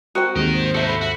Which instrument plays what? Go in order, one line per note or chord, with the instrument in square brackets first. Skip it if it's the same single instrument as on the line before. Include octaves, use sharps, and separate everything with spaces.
[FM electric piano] C4 A#4 D#6 [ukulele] F#4 G5
[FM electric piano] D#2 G#2 C3 [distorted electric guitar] A#4 D#5
[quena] C5
[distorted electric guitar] D#4 F#4 [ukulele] A4 E5
[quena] B5
[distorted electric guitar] F#4 [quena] E5